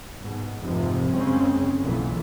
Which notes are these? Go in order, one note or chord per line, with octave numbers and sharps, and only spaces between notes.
G#2 B2
F1 F2 G#2 C3 F3
F#1 C#3 G#3 C4 C#4
B1 A#2 E3